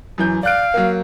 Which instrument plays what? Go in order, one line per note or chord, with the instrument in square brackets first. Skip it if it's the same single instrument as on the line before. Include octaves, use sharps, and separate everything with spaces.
[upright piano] F#2 E3 G6
[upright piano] D5 F#6 D7 [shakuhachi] F5
[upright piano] F#3 A#3